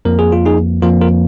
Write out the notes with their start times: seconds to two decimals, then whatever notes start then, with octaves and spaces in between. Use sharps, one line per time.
0.05 F2 F3 A#3 A#4
0.19 G#4
0.32 F4
0.46 D#4 G#4
0.82 F2 F3 A#3 F4 A#4
1.01 F4 A#4